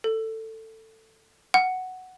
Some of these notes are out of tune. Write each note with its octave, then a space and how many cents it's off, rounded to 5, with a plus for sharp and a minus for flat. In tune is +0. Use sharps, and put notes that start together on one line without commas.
A4 +15
F#5 +5